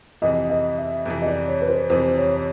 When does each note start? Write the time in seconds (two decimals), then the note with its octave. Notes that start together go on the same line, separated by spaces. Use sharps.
0.22 F2 C3 E3 D#5
0.50 D#5
0.78 E5
1.06 F2 C3 E3
1.22 D#5
1.26 D5
1.48 C#5
1.61 B4
1.68 C5
1.90 F2 C3 E3 C5
2.17 C#5
2.36 C#5